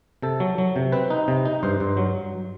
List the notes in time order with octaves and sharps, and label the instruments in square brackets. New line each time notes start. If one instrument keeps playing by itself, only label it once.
[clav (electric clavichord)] C3 A4
F#3
F#3
C3
C4 B4
D#4
C3
D#4
G2 C5
G2
F#3